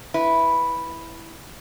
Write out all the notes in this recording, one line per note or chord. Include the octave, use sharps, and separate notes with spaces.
E4 B4